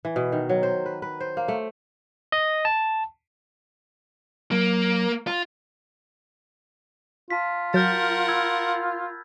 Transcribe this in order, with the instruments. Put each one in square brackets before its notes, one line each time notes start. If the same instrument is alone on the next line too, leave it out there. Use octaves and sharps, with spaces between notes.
[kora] E3
B2
D#3
F#3
C5
B4
B4
C5
A#3
A3
[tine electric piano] D#5
A5
[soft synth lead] F#3 [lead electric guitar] A#3
[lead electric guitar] F4
[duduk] F4 [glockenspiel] A5 B6
[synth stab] F#3 [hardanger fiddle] A#4 F#5 [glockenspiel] F6 G6 A6
[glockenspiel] B5 E6 G#6